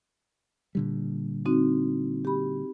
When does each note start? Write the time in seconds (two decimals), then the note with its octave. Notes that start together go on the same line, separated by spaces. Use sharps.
0.75 A#2 D3 G3
1.46 C4 D#4 F#4
2.25 G4 B5